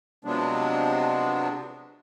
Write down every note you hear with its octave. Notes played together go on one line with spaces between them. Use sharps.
C3 F3 F#3 G#3 B3 D4